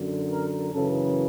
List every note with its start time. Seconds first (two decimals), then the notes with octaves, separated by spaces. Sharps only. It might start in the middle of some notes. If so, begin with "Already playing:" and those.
Already playing: F#2 D3
0.30 A#4
0.72 F#2 C#3 E3 A4